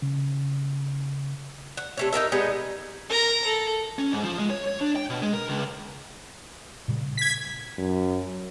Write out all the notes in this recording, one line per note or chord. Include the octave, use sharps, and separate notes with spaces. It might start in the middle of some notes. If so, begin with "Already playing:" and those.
C#3
F#5
C3 A3 C#5
D#4 F4 A#4 E5
G3 G#3 B3 D#4
A#4 A#5
A4
C#4
G#2
F3
G#3
C#5
C#5
D4
G5
B2
G#3
A#4
C#2
A#2 C#3 G3
G#6 B6
F#2